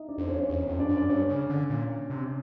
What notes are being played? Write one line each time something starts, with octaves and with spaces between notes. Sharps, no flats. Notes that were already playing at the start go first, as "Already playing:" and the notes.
Already playing: D#4 E4 D#5 E5
D4 D5
F2 C5
C#4 C#5
C5
E2 C#4 C#5
F2
D4 D5
F#2
D5
G2 C#4 C#5
C#3
D3
A#2
C3